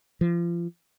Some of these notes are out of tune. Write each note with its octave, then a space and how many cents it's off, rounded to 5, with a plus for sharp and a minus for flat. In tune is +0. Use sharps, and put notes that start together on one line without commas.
F3 -30